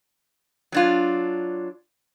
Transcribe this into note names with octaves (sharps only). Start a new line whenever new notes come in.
F#3 D4 F4